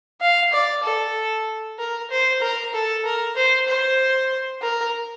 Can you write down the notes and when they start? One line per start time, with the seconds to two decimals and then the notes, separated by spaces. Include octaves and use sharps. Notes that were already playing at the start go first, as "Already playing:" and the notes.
0.21 F5
0.53 D5
0.84 A4
1.79 A#4
2.10 C5
2.42 A#4
2.74 A4
3.05 A#4
3.36 C5
3.68 C5
4.62 A#4